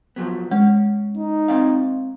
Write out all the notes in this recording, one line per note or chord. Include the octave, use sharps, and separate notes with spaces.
F3 F#3 B3
G#3 C#4
D#4
C4 D5 F5